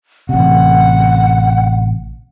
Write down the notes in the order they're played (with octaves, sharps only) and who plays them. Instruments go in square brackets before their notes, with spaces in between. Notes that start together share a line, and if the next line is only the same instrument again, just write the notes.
[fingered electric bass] A1 C3 [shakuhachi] F#5